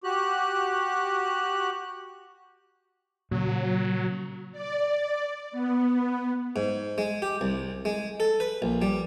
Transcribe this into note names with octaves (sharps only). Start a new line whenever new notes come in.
F#4 G4 F#6
A#2 C#3 F#3
D5
B3
G#2
G#3
G4
C2
G#3
A4
B4
A#1
G3